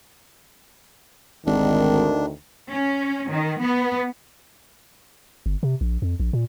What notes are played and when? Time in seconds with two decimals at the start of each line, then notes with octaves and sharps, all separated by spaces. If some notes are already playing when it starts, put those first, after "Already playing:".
1.47 G#1 D2 D#3 D4
2.71 C#4
3.30 D#3
3.61 B3
5.46 G1
5.63 C3
5.81 A#1
6.02 F2
6.20 A#1
6.33 A#2